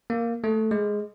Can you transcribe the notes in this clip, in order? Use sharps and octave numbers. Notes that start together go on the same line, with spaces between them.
A#3
A3
G#3